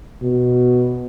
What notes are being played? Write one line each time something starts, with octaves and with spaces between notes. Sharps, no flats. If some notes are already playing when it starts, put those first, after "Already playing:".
B2